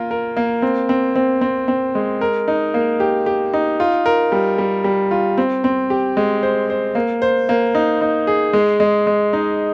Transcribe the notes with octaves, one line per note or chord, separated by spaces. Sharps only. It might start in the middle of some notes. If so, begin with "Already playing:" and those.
Already playing: A#3 F4 A#4
A#4
A#3
C4
C4
C4
C4
C4
G#3
A#4
D#4
A#3
G4
G4
D#4
F4
A#4
G3
G3
G3
F4
C4
C4
G4
G#3
C5
C5
A#3
C5
A#3
D#4
D#4
G#4
G#3
G#3
G#3
D#4